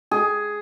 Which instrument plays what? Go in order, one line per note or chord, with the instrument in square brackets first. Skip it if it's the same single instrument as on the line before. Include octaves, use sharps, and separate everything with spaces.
[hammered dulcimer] G#4